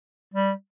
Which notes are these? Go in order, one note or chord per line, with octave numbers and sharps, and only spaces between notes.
G3